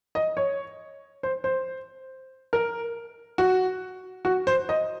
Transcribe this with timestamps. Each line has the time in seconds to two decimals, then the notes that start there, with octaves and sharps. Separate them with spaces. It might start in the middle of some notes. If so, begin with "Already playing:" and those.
0.15 D#5
0.37 C#5
1.23 C5
1.44 C5
2.53 A#4
3.38 F#4
4.25 F#4
4.47 C5
4.69 D#5